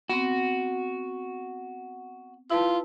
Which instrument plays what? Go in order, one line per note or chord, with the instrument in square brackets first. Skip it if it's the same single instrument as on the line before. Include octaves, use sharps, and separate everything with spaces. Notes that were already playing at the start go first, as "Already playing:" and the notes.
[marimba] B3 C4 [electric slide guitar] F#4
[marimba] E4 B4 A5 [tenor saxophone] F4